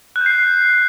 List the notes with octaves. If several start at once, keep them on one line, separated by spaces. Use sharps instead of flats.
F#6
G6
C7